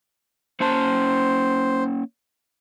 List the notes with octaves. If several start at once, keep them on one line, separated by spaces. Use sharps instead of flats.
A#3 C#4 C5 A5